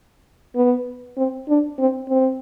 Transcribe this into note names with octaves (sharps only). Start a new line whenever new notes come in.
B3
C4
D4
C4
C4